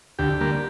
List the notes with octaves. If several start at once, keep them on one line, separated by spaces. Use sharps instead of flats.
D2 G4
D3 G3 A#3